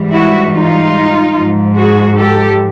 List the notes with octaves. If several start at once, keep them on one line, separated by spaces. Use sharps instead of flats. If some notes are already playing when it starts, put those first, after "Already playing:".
Already playing: G#2 E3 G3
E4 F#4
D#4 F4
G#2 F3
F#4 G#4
G4 A4